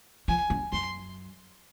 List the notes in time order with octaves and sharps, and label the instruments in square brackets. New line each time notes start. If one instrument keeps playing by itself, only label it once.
[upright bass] F3 [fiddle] G#5
[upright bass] F#2
[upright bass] F#2 [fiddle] C6